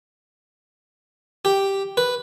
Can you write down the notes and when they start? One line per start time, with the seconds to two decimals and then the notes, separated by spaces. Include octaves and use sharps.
1.45 G4
1.97 B4